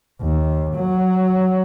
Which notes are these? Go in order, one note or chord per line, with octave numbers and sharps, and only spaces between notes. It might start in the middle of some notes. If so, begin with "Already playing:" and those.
D#2
F#3